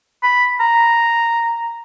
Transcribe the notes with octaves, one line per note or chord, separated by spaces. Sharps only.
B5
A#5